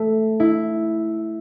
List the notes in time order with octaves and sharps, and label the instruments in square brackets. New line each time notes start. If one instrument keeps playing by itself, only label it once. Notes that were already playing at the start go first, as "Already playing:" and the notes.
Already playing: [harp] A3
E4